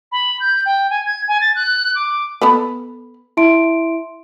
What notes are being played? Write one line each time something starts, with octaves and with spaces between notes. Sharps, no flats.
B5
G6
G5
G#5
G#6
G#5
A6
F#6
D6
B3 A4 B4
E4 E5 C6 D7